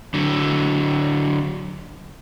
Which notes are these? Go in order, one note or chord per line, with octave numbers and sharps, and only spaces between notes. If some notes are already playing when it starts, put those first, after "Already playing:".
D3 F#3